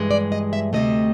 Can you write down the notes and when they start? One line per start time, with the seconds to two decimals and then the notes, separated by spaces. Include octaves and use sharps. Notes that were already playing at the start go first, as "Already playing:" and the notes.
Already playing: G2 E3 G#3
0.11 D5
0.32 D#5
0.53 E5
0.73 D2 C3 E3 A3 D#5